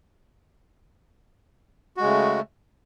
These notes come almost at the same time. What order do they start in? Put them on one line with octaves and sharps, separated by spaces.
F#4 G#3 C#3 A3